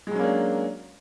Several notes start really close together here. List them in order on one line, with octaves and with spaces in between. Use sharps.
G#3 F#3 C#4 A#3 D4